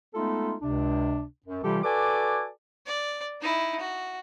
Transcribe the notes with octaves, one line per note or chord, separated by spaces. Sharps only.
G#3 A3 B3 D#4 F4 A4
C#2 C3 D4
F#2
C3 E3 G3 F4 G4 A4
F#4 A4 B4 D5 G#5 D6
D5
D#4 E4
F#4